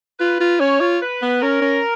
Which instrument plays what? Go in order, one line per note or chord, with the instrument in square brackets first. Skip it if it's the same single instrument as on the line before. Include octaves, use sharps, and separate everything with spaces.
[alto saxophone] F4 [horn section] B4
[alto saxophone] F4
[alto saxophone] C#4 [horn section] C#5
[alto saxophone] F4
[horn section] B4
[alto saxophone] B3
[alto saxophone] C#4 [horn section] A#4
[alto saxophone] C#4